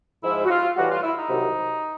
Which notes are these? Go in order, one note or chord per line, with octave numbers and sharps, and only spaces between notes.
G#2 F3 G#3 E4
F#4
F4
A2 E3 G3 F#4
F4
E4
D#4
C2 C3 D#3 F#3